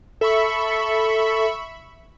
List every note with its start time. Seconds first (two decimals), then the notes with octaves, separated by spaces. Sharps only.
0.21 A4 E5 B5 C#6